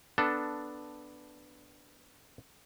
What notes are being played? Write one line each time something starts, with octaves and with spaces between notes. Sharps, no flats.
B3 D4 A4